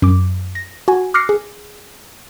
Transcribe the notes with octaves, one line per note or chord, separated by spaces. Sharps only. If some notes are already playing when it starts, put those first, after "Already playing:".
F#2 D6
A#6
F#4 G#5
D6 F6 F#6 A#6 C7 C#7
G#4